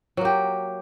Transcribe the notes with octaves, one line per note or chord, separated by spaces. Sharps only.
F#3 A#3 G4